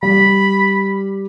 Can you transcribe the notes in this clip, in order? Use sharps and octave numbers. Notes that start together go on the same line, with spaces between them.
G3 B5